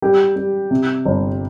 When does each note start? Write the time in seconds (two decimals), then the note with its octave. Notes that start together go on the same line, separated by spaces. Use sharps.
0.02 G3 G4
0.36 G3
0.71 C3
1.06 G1